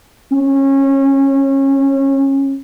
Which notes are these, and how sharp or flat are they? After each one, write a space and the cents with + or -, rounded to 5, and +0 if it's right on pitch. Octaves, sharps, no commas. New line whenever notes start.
C#4 -25